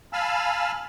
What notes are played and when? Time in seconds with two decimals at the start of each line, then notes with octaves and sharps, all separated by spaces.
0.13 F5 G#5 A5 B5 E6 F6